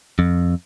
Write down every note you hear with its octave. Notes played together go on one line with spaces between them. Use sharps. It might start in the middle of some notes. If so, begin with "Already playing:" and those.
F2